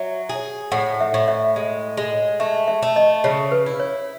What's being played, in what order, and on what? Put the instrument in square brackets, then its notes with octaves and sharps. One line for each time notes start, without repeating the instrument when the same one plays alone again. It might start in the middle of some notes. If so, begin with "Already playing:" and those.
Already playing: [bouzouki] F#3 [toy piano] E5
[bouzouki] G#4
[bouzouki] A2 [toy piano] F#5
[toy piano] E5
[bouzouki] A2
[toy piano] E5
[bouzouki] G#3
G#3
[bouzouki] A3 [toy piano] E5
[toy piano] E5
[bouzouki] A3
[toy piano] D#5
[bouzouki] C#3 [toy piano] C#5
[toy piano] B4
[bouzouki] E4
[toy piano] C#5